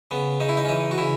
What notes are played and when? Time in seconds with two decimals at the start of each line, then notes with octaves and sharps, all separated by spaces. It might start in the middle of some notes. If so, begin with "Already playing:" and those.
0.11 C#3 B3
0.40 C#3 D#4
0.49 E4
0.57 D#4
0.65 C#4
0.68 E3 D#4
0.91 F#4
0.98 C#3 E4